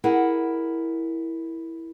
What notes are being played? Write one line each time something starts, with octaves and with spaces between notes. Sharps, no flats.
E4 G#4 A#4 F#5